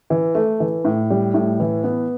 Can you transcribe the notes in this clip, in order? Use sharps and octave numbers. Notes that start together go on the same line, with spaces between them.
E3
A3
E3
A2
G3
A2
E3
B3